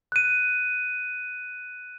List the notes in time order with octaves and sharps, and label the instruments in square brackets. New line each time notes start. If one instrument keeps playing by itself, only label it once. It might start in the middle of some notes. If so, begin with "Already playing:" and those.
[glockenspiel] F#6 D#7